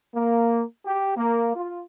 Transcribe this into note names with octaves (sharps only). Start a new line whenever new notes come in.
A#3
G4
A#3
F4